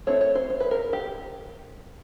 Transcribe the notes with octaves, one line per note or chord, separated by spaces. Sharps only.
A3 C4 E4 C#5
C#5
C5
C5
B4
A#4
G4